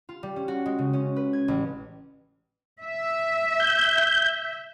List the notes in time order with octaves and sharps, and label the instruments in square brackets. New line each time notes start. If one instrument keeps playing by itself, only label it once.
[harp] F4
G3
C#4
F#4
G#3
C#3
C#4
B4
G#6
A1
[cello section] E5
[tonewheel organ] G6